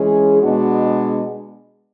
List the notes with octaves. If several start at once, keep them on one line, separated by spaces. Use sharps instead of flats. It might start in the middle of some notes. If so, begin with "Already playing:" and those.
Already playing: E3 G#3 C#4 G#4
B2 G#3 B3 D4 F#4